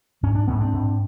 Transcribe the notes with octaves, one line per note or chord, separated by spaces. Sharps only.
G#2 C#4
D4
G#2 B3 C#4
C4 D4
G#2